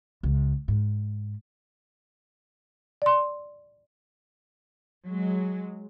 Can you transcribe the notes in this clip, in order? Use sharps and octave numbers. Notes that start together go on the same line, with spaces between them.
C#2
G#2
D5 C6
F#3 G#3